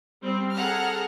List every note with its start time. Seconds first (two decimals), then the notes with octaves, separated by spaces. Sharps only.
0.22 G3 C4
0.55 G#4 A4 F#5 A#5 F6